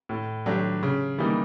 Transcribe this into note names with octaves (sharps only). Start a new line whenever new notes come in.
A2
F#3 A3 D4 G4
C#3
E3 G3 A#3 D#4